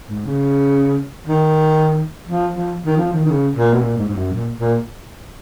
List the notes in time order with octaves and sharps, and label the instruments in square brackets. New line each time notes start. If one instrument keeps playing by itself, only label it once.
[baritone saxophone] G#2
C#3
D#3
F3
F3
D#3
F3
D#3
D#3
C#3
A#2
B2
A#2
G#2
G#2
F#2
A#2
A#2